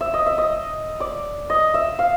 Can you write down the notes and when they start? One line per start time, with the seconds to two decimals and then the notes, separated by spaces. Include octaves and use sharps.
0.01 E5
0.14 D#5
0.26 E5
0.38 D#5
1.00 D5
1.50 D#5
1.74 E5
1.99 F5